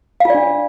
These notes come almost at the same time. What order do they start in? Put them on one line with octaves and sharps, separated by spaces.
F5 F4 D5 D4